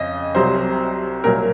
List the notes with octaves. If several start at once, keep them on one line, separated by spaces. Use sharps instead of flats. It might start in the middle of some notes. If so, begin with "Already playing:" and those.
Already playing: F2 C#3 D#5
C2 C3 F#3 C5
C2 A#2 F#3 A#4